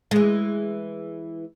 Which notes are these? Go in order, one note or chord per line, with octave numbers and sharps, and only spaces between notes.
E3 G#3